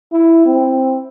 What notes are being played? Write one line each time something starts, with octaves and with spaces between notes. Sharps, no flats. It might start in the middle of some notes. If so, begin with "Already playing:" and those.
E4
C4